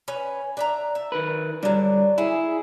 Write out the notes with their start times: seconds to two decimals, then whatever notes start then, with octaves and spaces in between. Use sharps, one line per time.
0.08 C#4 B4
0.57 D4 E5 A#5
0.95 E5
1.12 D#3 A#4 B4
1.63 G2 D3 F#3 D4
2.18 E4 G#4